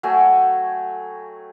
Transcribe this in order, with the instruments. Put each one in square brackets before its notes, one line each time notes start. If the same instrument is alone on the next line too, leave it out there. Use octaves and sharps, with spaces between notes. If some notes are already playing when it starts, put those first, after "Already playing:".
[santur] F#3 A3 G5 G#5